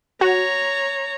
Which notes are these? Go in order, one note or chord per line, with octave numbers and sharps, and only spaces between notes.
F#4 C#5 A#5